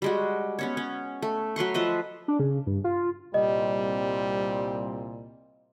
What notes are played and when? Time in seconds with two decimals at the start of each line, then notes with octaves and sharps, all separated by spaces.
0.02 G3 G#3 F#4
0.59 B3 C#4 C#5
0.77 C#4
1.22 A3
1.56 F#3 B4 C6 C#6
1.74 F3 B4 D#5 E5
2.28 D4
2.39 C#3
2.67 G2
2.84 F4
3.34 C2 A#2 G3 C4 D#5